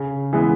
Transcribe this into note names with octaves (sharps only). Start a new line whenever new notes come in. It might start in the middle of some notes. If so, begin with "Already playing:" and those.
Already playing: C#3
E3 G#3 B3